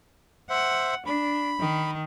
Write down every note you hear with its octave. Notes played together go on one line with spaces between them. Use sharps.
C5 E5 F#5
D4 B5
D#3